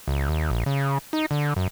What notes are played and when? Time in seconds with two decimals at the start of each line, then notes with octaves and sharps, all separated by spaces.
0.08 C#2
0.29 D#2
0.51 A#1
0.66 C#3
1.13 D#4
1.31 D3
1.56 F#2